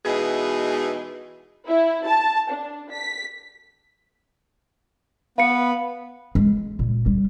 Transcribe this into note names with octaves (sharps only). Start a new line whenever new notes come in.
B2 E3 G#3 D#4 F#4 G#4
E4
A5
D4
B6
B3 B4 F5 C#7
G#3
A#2
G3